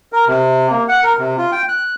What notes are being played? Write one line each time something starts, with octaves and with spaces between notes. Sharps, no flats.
A#4
C3
A#3
F#5
A#4
C3
F4
G5
F#6